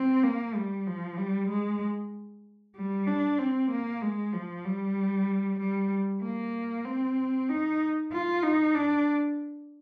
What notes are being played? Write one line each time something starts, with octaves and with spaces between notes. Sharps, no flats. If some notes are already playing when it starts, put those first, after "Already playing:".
Already playing: C4
A#3
G3
F3
G3
G#3
G3
D4
C4
A#3
G#3
F3
G3
G3
A#3
C4
D#4
F4
D#4
D4